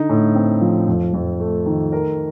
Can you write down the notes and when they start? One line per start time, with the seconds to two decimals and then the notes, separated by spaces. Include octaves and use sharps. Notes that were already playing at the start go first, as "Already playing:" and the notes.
Already playing: D3 D#4
0.09 A2
0.35 C4
0.61 F3
0.87 F2
1.13 F2
1.40 A3
1.66 D#3
1.92 A#4